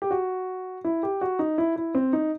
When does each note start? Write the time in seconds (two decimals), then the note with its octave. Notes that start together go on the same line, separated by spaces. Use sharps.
0.02 G4
0.11 F#4
0.84 E4
1.03 G4
1.21 F#4
1.39 D#4
1.58 E4
1.76 E4
1.95 C4
2.13 D#4